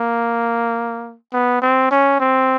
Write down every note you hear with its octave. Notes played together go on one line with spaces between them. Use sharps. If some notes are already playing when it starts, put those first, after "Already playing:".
Already playing: A#3
B3
C4
C#4
C4